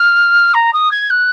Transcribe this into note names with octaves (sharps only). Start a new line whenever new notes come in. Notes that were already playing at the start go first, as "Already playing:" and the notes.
Already playing: F6
A#5
D#6
G#6
F#6